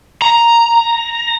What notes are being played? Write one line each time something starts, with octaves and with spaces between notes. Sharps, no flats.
A#5